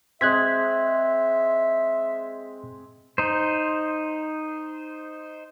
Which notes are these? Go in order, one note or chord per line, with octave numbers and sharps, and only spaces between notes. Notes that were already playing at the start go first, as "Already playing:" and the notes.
G#3 C4 E5 F#6 G#6 B6
D#4 C5